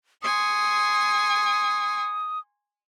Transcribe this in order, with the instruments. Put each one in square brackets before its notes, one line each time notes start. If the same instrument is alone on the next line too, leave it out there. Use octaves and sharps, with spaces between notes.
[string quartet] G#5 C6 C#6 [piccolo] D#6